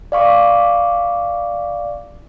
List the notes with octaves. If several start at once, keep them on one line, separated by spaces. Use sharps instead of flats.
D5 F5 C#6 D6